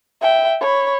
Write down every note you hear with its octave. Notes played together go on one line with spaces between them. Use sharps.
E5 G5
C#5 B5